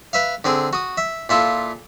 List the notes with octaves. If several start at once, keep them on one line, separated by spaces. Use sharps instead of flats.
B4 E5 F5
D3 C4 G#4
F#4 D#6
E5
A#2 E4 F4 A4